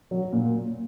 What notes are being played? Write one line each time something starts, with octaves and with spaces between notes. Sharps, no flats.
F#3
A#2